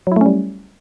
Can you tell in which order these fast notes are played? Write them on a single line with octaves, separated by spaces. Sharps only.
F#3 E4 A3 C#4 G3